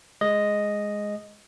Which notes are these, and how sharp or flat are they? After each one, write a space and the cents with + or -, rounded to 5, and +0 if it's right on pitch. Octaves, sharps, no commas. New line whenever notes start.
G#3 +0 D#5 +0